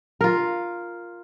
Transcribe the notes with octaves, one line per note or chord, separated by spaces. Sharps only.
F4 A#4